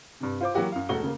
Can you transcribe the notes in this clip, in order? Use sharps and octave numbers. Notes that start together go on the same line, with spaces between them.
G2 C3
F4 C5 D6
E3 F#3 A#3 F#4 G4
F#2 F5
E1 A3 F#4 C#6 G7
C#3 A#3